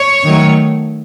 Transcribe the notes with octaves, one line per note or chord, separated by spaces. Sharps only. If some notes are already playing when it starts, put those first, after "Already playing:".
Already playing: C#5
D#3 F#3 A3